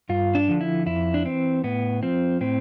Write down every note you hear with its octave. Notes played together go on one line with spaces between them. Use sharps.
G2 F4
D4
D3 F3
E4
F2 E4
D4
E3 C4
A2 B3
F3 C4
A2 C4